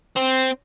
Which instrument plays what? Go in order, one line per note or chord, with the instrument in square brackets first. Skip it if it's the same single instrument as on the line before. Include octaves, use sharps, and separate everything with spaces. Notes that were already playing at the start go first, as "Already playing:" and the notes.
[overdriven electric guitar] C4